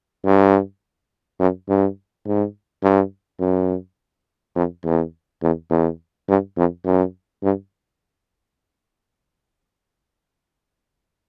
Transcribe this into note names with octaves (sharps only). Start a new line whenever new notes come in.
G2
F#2
G2
G#2
G2
F#2
F2
E2
E2
E2
G2
F2
F#2
G2